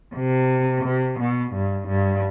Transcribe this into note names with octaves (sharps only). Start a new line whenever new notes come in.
C3
C3
B2
G2
G2